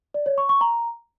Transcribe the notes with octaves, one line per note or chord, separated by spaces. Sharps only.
D5
C#5
C#6
C#6
A#5